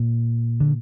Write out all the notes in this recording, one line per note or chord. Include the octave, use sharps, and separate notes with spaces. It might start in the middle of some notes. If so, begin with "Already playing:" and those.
Already playing: A#2
D3